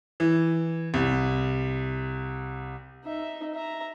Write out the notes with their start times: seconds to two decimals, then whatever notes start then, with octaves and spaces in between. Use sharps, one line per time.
0.20 E3
0.94 C2
3.05 D#4 E5
3.54 E5 A#5